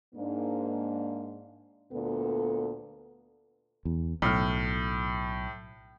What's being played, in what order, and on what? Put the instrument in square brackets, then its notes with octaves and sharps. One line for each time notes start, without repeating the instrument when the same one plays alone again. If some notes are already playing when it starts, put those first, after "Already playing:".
[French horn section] G#2 A#3 D4
D2 A#2 B3 A4
[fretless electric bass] E2
[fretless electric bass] B1 [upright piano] A2 F6